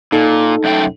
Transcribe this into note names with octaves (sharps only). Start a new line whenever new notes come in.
A#2 D#4 A4
F#2 A3 G5